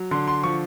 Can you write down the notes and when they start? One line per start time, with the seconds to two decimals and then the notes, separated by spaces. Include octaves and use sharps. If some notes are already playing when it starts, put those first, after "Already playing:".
Already playing: F#3
0.11 D3 C6
0.28 C6
0.43 F3 C#6